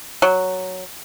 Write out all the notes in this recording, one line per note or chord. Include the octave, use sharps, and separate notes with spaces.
F#3